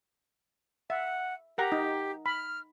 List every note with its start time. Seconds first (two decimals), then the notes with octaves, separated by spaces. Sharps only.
0.90 E5 F#5
1.58 G4 A#4 F#5 A#5
1.72 D#4
2.26 B5 F6